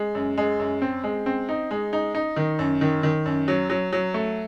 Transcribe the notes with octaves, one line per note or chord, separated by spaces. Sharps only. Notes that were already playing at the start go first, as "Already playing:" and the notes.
Already playing: G#3
F#2
G#3
F#2
C4
G#3
C4
D#4
G#3
D#4
D#4
D#3
F#2
D#3
D#3
F#2
F#3
F#3
F#3
A3